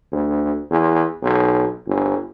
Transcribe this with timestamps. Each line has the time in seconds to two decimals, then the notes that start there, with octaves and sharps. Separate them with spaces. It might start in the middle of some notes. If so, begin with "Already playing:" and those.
0.12 D2
0.71 E2
1.23 B1
1.87 G1